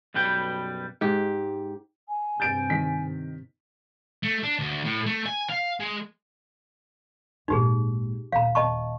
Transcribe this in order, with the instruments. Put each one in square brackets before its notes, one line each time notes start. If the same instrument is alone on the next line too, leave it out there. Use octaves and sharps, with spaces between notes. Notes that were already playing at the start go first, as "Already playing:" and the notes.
[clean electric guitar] B1 F#2 G3 B4 G5
[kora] G#2 G4
[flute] G#5
[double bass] G2 C3 [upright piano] G6 A6 D7
[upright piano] D#3 B6
[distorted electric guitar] A3
D4
D2
A2
A3
G#5
F5
G#3
[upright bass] G#1 A#2 [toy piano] D#4 G4 G#4
[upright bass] D#1 [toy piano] F5 A#5
[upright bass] D#1 [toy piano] D#5 A5 C#6